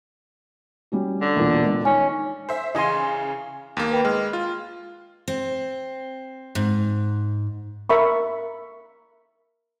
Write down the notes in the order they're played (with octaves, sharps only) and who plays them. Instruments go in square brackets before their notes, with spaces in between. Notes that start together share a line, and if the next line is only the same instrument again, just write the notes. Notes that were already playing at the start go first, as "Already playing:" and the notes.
[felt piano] G3 C#4 F#4
[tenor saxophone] D3
[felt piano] E1 A#2
C#2
[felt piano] D#3 [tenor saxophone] C#4 [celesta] G#5
[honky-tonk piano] C5 E5
[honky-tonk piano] C#3 E3 [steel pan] D#5 G#5 C6
[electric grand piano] D#2 A#3
[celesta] B4 G5 B5
[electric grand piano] G#3 [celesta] F6
[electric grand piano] F4
[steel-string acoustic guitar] C4
G#2
[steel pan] A#4 E5 B5 C#6